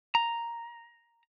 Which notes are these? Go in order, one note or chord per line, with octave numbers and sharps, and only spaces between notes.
A#5